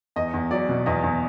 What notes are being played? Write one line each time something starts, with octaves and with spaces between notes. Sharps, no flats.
E2 D#5
E2
F#3 D5
B2
E2 D#5
E2